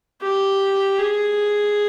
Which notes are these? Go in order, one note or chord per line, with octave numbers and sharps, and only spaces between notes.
G4
G#4